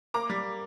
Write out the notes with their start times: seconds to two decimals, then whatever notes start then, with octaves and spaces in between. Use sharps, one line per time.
0.14 A#3 A#5 D6
0.30 G3